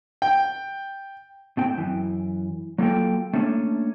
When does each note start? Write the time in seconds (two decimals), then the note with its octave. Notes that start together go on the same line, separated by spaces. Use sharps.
0.22 G5
1.57 A2 C4 G5
1.78 F#2 E3
2.78 F#3 A#3 F4 A4 G5
3.33 A3 A#3 C#4 D4